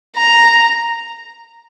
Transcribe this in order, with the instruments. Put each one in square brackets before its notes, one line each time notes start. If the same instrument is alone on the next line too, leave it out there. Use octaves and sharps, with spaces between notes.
[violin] A#5